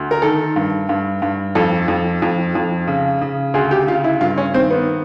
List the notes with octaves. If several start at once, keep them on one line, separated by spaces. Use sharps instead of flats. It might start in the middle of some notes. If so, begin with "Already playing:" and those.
Already playing: D2
A#4
D#3 A4
G2
G2
G2
F2 A4
F2
F2
F2
C#3
C#3
D2 G#4
G4
C#3 F4
E4
G2 F4
C#4
D#3 C4
B3